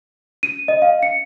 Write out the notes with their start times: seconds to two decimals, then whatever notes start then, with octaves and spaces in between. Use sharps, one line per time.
0.43 D#7
0.68 D#5
0.82 F5
1.03 C#7